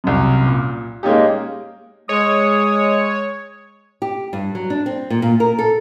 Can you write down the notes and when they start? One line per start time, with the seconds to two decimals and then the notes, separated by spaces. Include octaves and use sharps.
0.04 C2 F#2
0.46 A#2
1.03 G#3 A#3 C#4 D#4 G4
2.09 G#3 C#5 D#6
4.02 G4
4.33 G2
4.55 F#3
4.70 D4
4.86 C4
5.10 A#2
5.22 A#2
5.40 A#4
5.59 A4